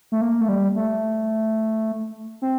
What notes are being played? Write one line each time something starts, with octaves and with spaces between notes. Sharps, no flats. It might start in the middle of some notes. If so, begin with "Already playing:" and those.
A3
A#3
A3
G3
A3
C4